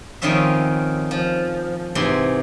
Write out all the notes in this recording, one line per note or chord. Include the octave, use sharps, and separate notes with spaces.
F2 D#3 C4 C#4 F4 E5
F3
G#2 C3 E3 C6